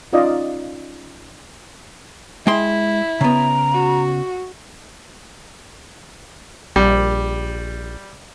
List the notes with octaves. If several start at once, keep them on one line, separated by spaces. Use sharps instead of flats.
C#4 D#4 F4 D5 D#5 F5
G#3 E4 G5 C6
C#3 B3 A#5
F#4
A#1 G3